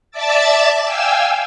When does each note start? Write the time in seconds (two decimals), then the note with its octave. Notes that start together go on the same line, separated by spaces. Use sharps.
0.11 D5 E5 A5 D6 E6 A6
0.84 F5 G5 G#5 E6